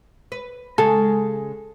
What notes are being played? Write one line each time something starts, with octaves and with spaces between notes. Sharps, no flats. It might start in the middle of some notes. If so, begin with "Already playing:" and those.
B4
C#3 G#3 A4